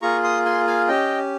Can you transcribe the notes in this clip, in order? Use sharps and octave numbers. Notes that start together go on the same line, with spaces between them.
A#3 F4 G#4 A#5 C#6
C6 D#6
G#5 C6
F5 G#5
C#4 G4 D#5 G5